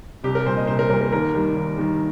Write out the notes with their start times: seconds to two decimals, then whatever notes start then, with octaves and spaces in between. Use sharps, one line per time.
0.24 C2 G4
0.35 A#4
0.46 A#2 G3 C5
0.57 D#5
0.67 C2 C5
0.79 A#4
0.89 G3 A#4
0.93 A#2
1.01 A#4
1.12 D#2 A#4
1.34 D#3 G3
1.56 D#2
1.77 D#3 G3